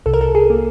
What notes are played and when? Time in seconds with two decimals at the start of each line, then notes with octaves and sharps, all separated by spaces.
0.06 C2 A4
0.14 A#4
0.21 A4
0.35 G#4
0.50 A#3